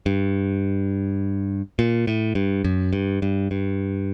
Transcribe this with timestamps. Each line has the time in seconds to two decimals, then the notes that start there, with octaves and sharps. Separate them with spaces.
0.06 G2
1.79 A#2
2.07 A2
2.35 G2
2.64 F#2
2.93 G2
3.22 G2
3.51 G2